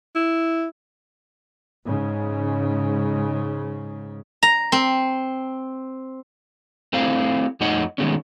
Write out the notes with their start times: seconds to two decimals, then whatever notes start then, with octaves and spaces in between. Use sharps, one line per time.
0.15 E4
1.85 G#2 C#3
4.43 A#5
4.72 C4
6.93 A3 C4 E4 C5 F5
7.60 F2 A3 D#4 C#5 D#5 F#5
7.98 D#3 G#3 A3 B3 C#4